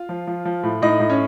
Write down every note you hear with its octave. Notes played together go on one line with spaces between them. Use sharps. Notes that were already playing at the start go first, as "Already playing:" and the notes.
Already playing: F4 F5
F3
F3
F3
A2
A2 D#4 D#5
A2
C#4 C#5